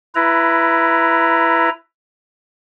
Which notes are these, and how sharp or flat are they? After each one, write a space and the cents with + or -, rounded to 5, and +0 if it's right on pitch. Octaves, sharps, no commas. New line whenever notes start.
E4 +15 B4 +0 A#5 +0